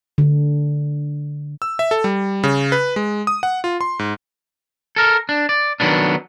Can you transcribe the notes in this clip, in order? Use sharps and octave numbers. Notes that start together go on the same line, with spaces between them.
D3
E6
E5
A4
G3
C#3
B4
G#3
D#6
F#5
F4
C6
G#2
A4 A#4
D4
D5
D#3 F#3 B3 D4